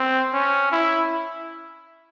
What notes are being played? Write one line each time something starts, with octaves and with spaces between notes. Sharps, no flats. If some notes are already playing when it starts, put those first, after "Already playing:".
Already playing: C4
C#4
E4